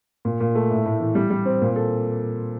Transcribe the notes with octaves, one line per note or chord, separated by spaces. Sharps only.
A#2
A#2
A3
A2
A2
E3
G3
G3
C4
A#2
A4